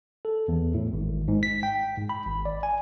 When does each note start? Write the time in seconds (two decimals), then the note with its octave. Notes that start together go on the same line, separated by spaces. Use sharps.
0.25 A4
0.48 E2
0.74 A2
0.93 G#1
1.28 G#2
1.43 B6
1.63 G5
1.98 G#2
2.09 B5
2.26 G#1
2.45 D5
2.63 G#5